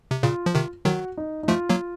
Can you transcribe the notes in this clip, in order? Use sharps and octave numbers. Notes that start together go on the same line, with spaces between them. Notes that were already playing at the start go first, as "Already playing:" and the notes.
C3
A#2 C#3 F4
F3
C3 D#3
D#3 F#3 F#4
D#4
D#4
F3 A3 F4
F#3 A#3